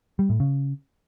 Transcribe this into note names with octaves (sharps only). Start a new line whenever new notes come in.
G3
A2
C#3